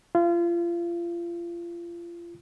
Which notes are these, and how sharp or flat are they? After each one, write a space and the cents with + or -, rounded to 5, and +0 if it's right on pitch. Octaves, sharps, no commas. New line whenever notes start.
F4 -30